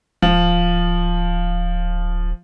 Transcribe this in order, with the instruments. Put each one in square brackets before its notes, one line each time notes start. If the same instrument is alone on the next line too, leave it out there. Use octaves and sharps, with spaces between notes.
[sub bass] D1 [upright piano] F3